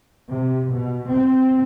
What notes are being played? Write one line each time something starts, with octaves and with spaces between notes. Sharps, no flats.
C3
B2
C4